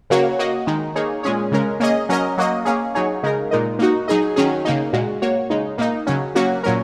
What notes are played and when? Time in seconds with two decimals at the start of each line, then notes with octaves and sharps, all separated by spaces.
0.10 C#3 F#3 A#3 F#4 C#5
0.39 A#3 F#4 D#5
0.67 D#3 G#3 D#4
0.96 A#3 D#4 G#4 C#5
1.23 A#2 G#3 C#4 G#4 C#5
1.52 C#3 G#3 C#4 A#4
1.80 A#3 C#4 G#4 D#5
2.09 F#3 C#4 A#4 D#5
2.38 F#3 A#3 F#4 D#5
2.65 A#3 C#4 G#4
2.95 F#3 D#4 G#4 C#5
3.23 C#3 G#3 D#4 A#4
3.51 A#2 G#3 D#4 A#4 D#5
3.79 A#3 D#4 F#4
4.08 F#3 D#4 G#4 D#5
4.36 D#3 F#3 C#4 G#4
4.65 C#3 A#3 D#4
4.93 A#2 G#3 F#4
5.22 A#3 F#4 C#5
5.50 C#3 G#3 D#4
5.78 A#2 A#3 D#4
6.07 C#3 F#3 C#4
6.35 F#3 A#3 C#4 F#4
6.63 A#2 F#3 C#4 A#4